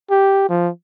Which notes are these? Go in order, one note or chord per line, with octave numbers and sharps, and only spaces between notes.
G4
F3